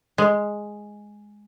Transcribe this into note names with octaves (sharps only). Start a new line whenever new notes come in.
G#3